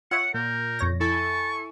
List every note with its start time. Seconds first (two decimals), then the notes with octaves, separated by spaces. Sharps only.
0.11 F4 C#5 E5 F#5 C#7
0.34 A#2 A#4 G6
0.79 F2 C#5 A#6
1.00 E4 A4 G#5 C#6 A6